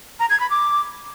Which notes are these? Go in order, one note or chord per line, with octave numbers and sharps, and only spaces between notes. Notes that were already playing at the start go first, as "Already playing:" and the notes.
A#5
G#6
B5
D6